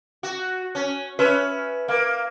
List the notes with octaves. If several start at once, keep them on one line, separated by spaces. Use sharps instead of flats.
F#4
C#4
C#4 B4 E5
A#3